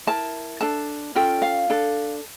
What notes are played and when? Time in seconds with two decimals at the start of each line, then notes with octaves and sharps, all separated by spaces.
0.07 E4 A#4 A5
0.61 D4 A4 A5
1.15 C#4 F4 A4 G5
1.42 F5
1.70 D4 A4